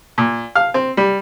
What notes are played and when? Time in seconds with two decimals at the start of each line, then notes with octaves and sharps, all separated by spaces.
0.18 A#2
0.55 F5
0.74 C4
0.97 G3